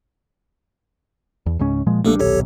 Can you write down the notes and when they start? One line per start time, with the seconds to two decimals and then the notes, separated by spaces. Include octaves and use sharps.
1.46 E2
1.59 C#2 G#2 C#4
1.87 A#2 F3 G#3
2.05 A#1 G3 A3 A#3 D4 A4
2.19 D#1 B1 G4 A4 C#5